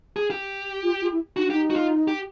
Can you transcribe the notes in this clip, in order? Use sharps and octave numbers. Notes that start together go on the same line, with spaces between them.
G#4
G4
F4
F4
E4
D#4 F#4
D4
D#4 G4
F#4
F4
G4